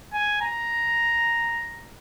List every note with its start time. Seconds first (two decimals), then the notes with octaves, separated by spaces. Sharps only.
0.13 G#5
0.41 A#5